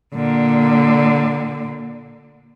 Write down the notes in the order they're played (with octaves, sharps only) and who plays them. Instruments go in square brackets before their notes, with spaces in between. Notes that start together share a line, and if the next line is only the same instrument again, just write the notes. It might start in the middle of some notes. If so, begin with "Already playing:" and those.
[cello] A#2 D3